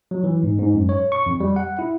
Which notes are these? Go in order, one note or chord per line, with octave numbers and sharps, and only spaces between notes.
F#3
E3
G#2
G#2
F#2
C#5
C#6
F2
G3
F#5
E4